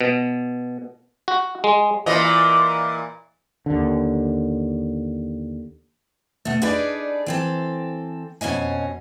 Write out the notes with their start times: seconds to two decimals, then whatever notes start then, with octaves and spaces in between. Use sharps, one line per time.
0.01 B2
1.28 F#4
1.64 G#3
2.06 A#2 E3 D#5
3.66 D#2 D3
6.45 B2 A3
6.62 D4 D#4 G#4 A4 B4 D5
7.26 E3 C4 A4
8.41 F2 B2 C#4 D#5 G#5